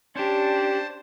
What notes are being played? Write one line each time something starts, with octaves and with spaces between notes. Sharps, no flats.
C#4 D4 G4 C5 A5